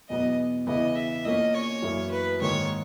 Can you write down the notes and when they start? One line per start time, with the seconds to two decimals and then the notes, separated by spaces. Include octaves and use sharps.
0.09 E2 B2 F#3 B3 D#5
0.67 E2 C#3 E3 B3 E4 D#5
0.96 E5
1.25 A#2 A#3 C#4 D#5
1.55 C#5
1.82 F#2 E3 A#3 E4
2.11 B4
2.41 G#2 D#3 A#3 C#5